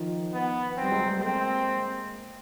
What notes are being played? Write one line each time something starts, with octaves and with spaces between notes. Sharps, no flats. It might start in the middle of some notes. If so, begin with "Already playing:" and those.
Already playing: D#3 F3
B3
C4
G3
F#3 G#3
G3 A3
G#3 A#3 C4